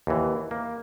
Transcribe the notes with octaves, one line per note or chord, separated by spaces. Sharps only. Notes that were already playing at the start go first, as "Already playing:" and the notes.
D#2 E3
A#3